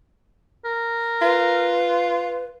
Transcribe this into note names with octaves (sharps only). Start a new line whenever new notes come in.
A#4
F4 B4